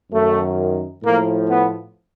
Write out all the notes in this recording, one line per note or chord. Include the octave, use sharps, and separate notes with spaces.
F#2 D#3 A3
A2 F3 A#3
B3